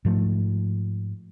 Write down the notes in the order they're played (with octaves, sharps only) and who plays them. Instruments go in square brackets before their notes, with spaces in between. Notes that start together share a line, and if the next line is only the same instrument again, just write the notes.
[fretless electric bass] G#2 F3 A3